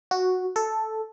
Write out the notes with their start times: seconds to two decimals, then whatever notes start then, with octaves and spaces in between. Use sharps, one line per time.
0.11 F#4
0.56 A4